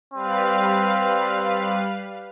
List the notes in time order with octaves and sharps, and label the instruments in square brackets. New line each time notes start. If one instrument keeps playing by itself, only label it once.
[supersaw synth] G3 B4 F5 [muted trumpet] C4